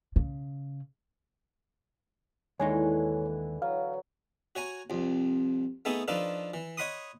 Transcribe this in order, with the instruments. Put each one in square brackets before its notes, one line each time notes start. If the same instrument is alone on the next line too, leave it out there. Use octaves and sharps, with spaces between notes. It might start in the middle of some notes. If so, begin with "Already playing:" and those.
[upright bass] C#3
[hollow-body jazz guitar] D#2 G#3 D#4 [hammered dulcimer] D3 E3 [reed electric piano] C#5 G#5
[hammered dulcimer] F#3 [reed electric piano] F5
[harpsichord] F#4 C#5 G#5 A#5
C2 F2
A3 B3 D#4 G#4 A4
F3 D4 D#4 F4 A4 B4
E3
C#5 D#5 F#5 B5 C6 D#6